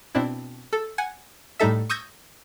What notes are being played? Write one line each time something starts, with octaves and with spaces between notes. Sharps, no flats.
B2 C4 D4 E4
A4
F#5 G#5
A2 G3 D#4 A4 E5
C#6 D#6 E6 G6 G#6 A#6